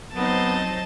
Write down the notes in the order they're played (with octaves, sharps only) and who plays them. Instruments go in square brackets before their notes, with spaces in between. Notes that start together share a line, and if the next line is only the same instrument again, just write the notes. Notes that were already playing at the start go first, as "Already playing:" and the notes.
[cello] F#3 [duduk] B3 [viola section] C4 D#4 C5 [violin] D#5 A5